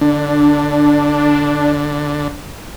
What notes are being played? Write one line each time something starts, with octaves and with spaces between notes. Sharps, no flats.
D3 D4